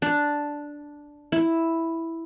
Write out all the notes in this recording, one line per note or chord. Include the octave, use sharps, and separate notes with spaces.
D4
E4